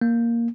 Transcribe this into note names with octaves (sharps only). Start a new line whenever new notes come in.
A#3